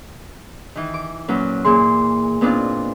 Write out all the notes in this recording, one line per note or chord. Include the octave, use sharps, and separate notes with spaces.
D#3 E3
D6
A#2 F#3 C#4 B4
A#2 E3 G#4 C6
A#2 B3 C4 D4 D#4 F4